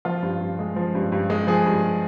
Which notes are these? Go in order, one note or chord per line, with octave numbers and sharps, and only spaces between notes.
F3 F4
G2
G2
G#3
F3
G2
G2
G#3
F3 G#4
G2